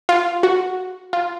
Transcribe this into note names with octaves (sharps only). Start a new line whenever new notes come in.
F4
F#4
F4